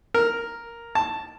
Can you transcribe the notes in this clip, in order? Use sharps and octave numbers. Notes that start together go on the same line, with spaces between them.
A#4
A5